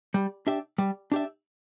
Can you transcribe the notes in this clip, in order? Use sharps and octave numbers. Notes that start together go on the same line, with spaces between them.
G3
D4 G4 E5
G3
D4 G4 E5